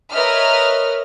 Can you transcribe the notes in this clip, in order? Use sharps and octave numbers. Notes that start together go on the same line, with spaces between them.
A#4 B4 C#5 D#5 E5 F6